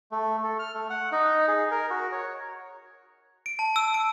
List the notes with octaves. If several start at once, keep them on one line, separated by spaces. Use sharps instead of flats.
A3
A4
F6
A3
F#5
D#4
G#4
A#4
F#4
C#5
D7
A5
E6
D7